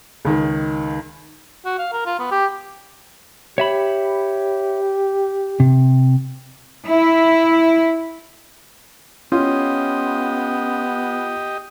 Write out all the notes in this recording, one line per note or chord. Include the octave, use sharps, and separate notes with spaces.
C#2 D#3
F#4
F5
A#4
F4
B3
G4
G4 C#5 E5 B5
C3
E4
B3 C#4 F4 G4 D#5